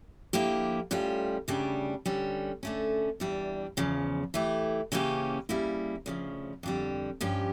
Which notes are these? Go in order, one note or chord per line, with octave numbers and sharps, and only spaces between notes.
D3 F3 A#3 E4 G4
A2 G3 C#4 F4
D2 C#3 G3 D4
D3 G3 C#4
D3 A3 C#4
E2 E3 G3 D4
E2 C#3 F3
E3 A3 E4 G4
C#3 E3 A#3 C#4 G4
C#3 G3 A#3 E4
D2 C#3 F3
F2 D3 G3
G2 F3 C#4 G4